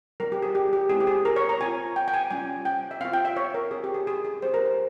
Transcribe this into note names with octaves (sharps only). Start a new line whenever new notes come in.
G3 C4 F4 A#4
G4
G#4
G4
G4
G#3 C4 E4 G4 G#4
G4
G#4
A#4
C#5
A#5
C4 F4 G#5
G5
G5
G#5
G3 C#4 F4 G#5
G5
E5
C4 F4 F5
G5
E5
C#5
A#4
C4 G4 G#4
G4
G#4
G#4
G#4
G3 C4 G4 C5
A#4
C5